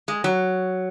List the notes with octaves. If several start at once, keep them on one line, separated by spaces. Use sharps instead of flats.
G#3
F#3